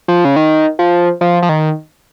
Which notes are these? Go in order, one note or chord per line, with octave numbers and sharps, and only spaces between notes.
F3
C#3
D#3
F3
F3
F3
D#3